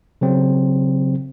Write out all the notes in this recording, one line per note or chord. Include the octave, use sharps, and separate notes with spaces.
C#3 F#3 C4